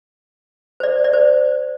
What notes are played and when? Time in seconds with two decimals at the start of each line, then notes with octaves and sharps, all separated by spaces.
0.80 C5
0.83 D5
1.04 D5
1.13 C5